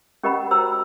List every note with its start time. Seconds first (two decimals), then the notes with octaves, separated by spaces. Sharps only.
0.23 C#4 G4 A#4 D#5 F#5 B5
0.51 F#4 C5 A#5 E6